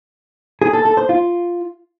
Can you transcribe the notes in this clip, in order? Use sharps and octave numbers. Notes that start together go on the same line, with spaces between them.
G#4
A4
A4
C5
F4